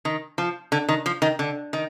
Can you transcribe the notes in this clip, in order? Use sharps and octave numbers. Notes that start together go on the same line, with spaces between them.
D#3
F3
D3
D#3
F3
D#3
D3
D#3